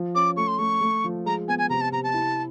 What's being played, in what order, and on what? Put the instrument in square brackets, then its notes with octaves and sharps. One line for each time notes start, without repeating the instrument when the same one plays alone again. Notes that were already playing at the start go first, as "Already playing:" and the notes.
Already playing: [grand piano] F3
[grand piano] C#4 [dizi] D6
[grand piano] A3 [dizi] C#6
[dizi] C6
[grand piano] A3 [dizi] C#6
[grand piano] A3
F3
[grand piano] G#3 [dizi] A#5
[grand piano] B3 [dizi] G#5
[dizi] G#5
[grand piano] C3 [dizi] A#5
[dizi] A5
[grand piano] C3 [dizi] A#5
[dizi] A5
[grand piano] E4